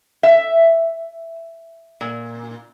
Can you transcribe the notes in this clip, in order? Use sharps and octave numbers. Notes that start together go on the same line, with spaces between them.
E5
A#2